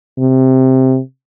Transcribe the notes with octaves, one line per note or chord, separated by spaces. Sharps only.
C3